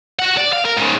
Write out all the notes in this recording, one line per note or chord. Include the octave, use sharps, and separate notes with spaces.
F#4 F#5
D5
F5
A#4
G#2 C#3